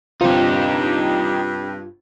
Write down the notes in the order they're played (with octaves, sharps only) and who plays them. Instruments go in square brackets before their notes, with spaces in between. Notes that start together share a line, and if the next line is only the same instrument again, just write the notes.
[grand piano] G1 C3 C5 [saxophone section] G2 [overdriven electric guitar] D#4 G4 [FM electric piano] F4